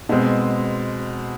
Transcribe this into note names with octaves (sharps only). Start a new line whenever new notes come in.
B2 G#3 C4